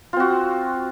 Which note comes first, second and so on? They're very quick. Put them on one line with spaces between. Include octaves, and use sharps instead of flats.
F4 C4 F#4